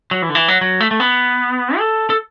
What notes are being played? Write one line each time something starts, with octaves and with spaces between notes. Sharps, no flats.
F#3
E3
D3
E3
F#3
F#3
A3
A3
B3
A4
A4